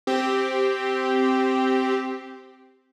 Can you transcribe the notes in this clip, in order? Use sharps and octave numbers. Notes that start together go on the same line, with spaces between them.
C4 G4